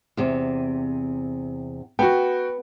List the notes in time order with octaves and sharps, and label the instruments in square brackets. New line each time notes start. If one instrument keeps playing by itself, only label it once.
[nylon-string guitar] E2 C3
[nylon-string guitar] B3 [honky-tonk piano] F#4 G5